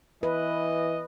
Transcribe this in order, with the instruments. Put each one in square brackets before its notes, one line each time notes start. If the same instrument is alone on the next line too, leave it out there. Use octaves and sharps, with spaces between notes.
[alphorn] E3 [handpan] B4 [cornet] D#5